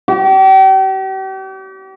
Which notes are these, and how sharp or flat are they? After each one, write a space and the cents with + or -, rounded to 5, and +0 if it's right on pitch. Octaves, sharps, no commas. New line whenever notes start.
G4 -40